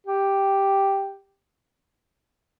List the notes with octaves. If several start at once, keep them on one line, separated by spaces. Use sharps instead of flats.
G4